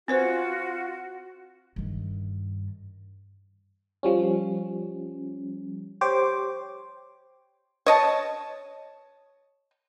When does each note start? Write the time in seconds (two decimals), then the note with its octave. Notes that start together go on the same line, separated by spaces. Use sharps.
0.08 C4 F4 F#4 B4 C5
1.76 G2 D#3
4.03 F3 G3 C#4
6.01 G4 C5 C#5 D6
7.86 C#5 D#5 A5